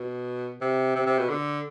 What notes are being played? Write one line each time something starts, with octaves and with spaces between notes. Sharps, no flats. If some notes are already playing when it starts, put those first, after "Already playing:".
Already playing: B2
C3
C3
C3
B2
D3